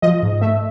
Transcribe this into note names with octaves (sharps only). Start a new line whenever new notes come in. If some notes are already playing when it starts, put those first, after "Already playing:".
F3 D#5
G#2
A3 E5